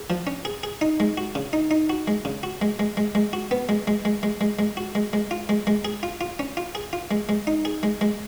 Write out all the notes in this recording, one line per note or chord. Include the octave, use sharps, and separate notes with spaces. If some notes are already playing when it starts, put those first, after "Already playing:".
Already playing: G#4
F3
C#4
G#4
G#4
D#4
G#3
F#4
C#3
D#4
D#4
F#4
G#3
C#3
F#4
G#3
G#3
G#3
G#3
F#4
B3
G#3
G#3
G#3
G#3
G#3
G#3
F#4
G#3
G#3
F4
G#3
G#3
G#4
F4
F4
C#4
F4
G#4
F4
G#3
G#3
D#4
G#4
G#3
G#3